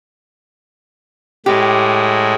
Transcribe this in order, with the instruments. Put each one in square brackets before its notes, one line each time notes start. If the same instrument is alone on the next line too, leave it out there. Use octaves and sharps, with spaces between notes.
[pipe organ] A2 G#3 [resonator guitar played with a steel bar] G4